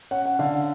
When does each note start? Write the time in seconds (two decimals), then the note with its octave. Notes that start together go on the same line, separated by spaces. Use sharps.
0.11 C#4 F#5
0.26 F#5
0.39 D3 F5